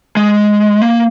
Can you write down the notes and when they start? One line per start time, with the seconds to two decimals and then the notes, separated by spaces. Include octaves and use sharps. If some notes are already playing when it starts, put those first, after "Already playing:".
0.17 G#3
0.82 A#3